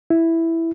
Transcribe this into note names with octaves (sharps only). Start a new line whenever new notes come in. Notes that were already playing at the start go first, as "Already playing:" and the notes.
E4